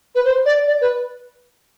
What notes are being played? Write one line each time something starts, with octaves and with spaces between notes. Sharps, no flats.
B4
C5
D5
D5
B4